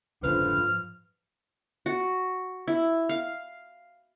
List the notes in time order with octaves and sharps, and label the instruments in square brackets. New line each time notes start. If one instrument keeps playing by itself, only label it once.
[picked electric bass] F#1 F2 D3 [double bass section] G#2 F3 [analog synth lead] B4 [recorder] F6
[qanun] F#4
E4
F5